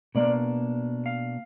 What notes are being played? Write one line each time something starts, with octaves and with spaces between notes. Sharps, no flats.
B2 A#3 D4 D5
F5